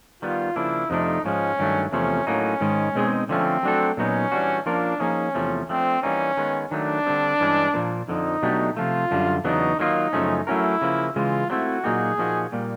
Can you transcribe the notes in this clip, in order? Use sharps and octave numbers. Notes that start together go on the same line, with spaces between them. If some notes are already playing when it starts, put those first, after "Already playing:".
D#3 G3 B3 F4
C#3 F3 A#3 D4 E4
F2 C3 F3 A3 D4 D#4
G#2 F3 G#3 C#4
G2 D#3 F#3 A3
E2 C3 F3 A3 C#4
A2 F#3 A#3 C#4 D#4
G#2 D#3 G#3
B2 G#3 C4 D#4 G#4
D3 F3 A3 C4 C#4
F#3 A3 D4 F#4 A4
A#2 F#3 B3 C#4 D#4 F#4
E3 G3 B3 D4 F#4
F3 A#3 C#4 D4 F4 A#4
F3 A#3 C#4 D#4 G#4
E2 C3 F3 A3
F3 A3 C4 D4
E3 G3 A#3 C#4 D#4
D#3 G#3 B3
D#3 F#3 A3 D4
D3 G3 C4
G2 E3 G#3 C#4
A#2 F3 A#3
F2 D3 F3 D#4
B2 F#3 A3 D4 G4
C3 F3 A3 F4
F#2 D3 G3
E2 C#3 F#3 B3 D4 D#4
D#3 F#3 A#3 D4 D#4 F4
F#2 C#3 F3 A3 C#4
F#3 A3 C#4 E4 F#4 A#4
C#3 F3 A#3
C#3 E3 G#3 F4
F#3 A3 C4 E4 F#4
A#2 F#3 A#3 D#4 F#4 G#4
A#2 F3 A#3 D#4 F#4
A#2 G3 A#3